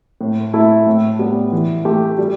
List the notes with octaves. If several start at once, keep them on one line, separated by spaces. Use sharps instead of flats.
A2
A3 E4 A4
A2
G3 B3
E3
A3 G4
G3